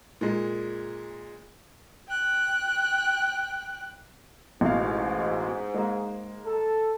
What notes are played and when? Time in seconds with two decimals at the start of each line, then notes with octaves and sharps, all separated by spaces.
0.21 A#2 G#3
2.08 G5 F#6
4.61 A1 G#2 B2 F5
5.74 G#3 A#3
6.46 A4